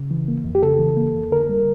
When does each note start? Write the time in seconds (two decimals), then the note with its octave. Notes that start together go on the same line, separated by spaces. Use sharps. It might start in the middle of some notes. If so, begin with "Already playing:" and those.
Already playing: C#3
0.11 E3
0.28 A#3
0.44 F2
0.55 G4
0.63 C#3 A4
0.79 E3
0.97 A#3
1.14 F2
1.31 D3 A#4
1.49 G3